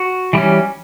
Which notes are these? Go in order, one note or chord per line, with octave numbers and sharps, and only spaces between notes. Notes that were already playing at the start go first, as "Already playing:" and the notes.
Already playing: F#4
E3 G3 C#4